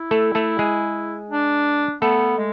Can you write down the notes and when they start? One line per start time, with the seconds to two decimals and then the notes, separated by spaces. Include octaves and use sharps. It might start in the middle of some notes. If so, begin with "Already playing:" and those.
Already playing: E4
0.11 A3 A4
0.35 A3 A4
0.59 G#3 G#4
1.30 D4
2.02 A3 B3 A4
2.38 G#3